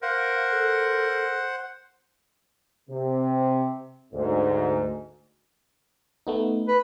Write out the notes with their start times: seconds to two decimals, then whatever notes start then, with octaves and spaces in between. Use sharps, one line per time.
0.02 A#4 C5 F5 F#5
0.52 A4
2.90 C3
4.13 D2 G#2
6.27 A3 B3 D#4
6.68 B4